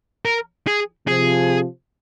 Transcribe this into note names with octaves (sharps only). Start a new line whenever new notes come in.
A#4
G#4
C3 F3 G#4